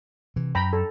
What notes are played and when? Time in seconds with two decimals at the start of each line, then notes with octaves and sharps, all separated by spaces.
0.36 C3 E3
0.55 F#2 G5 A#5 B5
0.73 A4